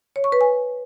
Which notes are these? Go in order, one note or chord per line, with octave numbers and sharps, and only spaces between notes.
C#5
C#6
B4
G#5